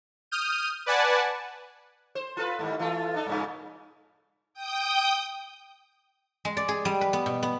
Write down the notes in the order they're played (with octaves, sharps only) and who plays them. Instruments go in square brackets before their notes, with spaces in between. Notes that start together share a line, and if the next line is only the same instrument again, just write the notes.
[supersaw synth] D#6 F6 G6 D#7
B4 D5 F#5 G#5 A5
[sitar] C5
F4 A4 B4
G#2 D#3 G3
E3 A3 F4
D4 D#4 A4
G2 A#2 C#3
[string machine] G5 D#6 G6
[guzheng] G#3
D5
G#4
G3
B4
B3
B2
B3